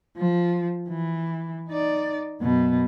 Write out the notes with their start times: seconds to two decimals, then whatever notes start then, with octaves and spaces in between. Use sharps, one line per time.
0.17 F3
0.89 E3
1.69 D#4 D5
2.41 F#2 B2